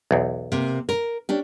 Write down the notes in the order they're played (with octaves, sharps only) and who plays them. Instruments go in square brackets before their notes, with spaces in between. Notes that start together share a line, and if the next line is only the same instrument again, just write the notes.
[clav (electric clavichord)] B1 E2
[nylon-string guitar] C3 A#3
A#4
C#4 D4 G4